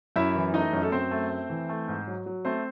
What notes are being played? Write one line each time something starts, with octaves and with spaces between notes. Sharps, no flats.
F#2 E4 E5
E3
A3 D#4 D#5
F#2
A4
F#2 C4 C5
A3
A3
E3
A3
G#2
F#3
F#3
A3 C4 C5